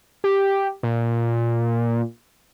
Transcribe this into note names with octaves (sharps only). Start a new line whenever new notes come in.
G4
A#2